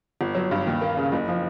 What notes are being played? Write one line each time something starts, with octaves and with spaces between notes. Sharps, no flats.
G1
F#3
G2
D#2
A#3
C#3
F#1
F3